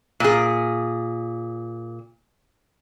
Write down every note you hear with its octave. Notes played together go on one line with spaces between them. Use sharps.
A#2 G#4